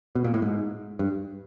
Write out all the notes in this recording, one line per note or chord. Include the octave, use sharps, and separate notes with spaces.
B2
A#2
A2
G#2
G2